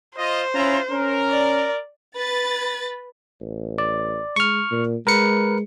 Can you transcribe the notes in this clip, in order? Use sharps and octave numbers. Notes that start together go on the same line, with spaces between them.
F4 C5 D#5
C#4 E4 F4 A#5
C#4 A#4
D5
B4 A6
A1
D5
G#3 C#6 F6
A#2
G#3 A#4 B4 C#7